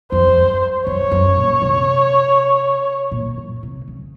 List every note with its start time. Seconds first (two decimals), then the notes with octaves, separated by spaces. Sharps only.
0.12 F2 C5
0.37 F#2
0.87 F#2 C#5
1.11 F#2
1.37 A#2
1.62 C3
3.11 A#2
3.37 F#2
3.63 C3
3.88 C#3